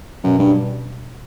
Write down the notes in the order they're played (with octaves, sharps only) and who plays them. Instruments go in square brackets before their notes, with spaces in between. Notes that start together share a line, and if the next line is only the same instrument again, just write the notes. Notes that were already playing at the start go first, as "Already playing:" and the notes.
[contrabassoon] F#2 [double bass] B2
[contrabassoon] G2